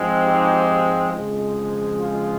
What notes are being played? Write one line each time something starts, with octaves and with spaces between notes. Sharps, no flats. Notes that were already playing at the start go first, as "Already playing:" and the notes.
Already playing: G#2 F3 G#3 C4
D#4 G4
F2 C#3 F3 G#3
F4 G#4